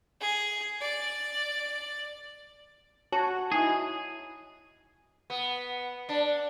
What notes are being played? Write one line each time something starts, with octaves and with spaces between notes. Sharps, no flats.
G#4
D5
F#4 C#5 A5
D#4 E4 G#4
B3
D4